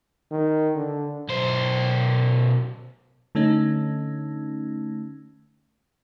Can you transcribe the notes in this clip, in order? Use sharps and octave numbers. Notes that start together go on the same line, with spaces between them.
D#3
D3
B1 C5
D3 A3 C#4 D#4